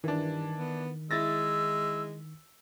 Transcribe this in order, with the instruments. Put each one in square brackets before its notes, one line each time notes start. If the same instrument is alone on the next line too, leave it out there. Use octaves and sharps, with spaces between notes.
[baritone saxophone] G2 [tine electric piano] D#3 [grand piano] E3 D4
[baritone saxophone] B3
[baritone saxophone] G#3 [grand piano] E4 A6 A#6 [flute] E6